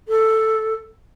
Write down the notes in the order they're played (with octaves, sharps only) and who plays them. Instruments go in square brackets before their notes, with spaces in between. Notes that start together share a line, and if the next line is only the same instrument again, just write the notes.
[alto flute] A4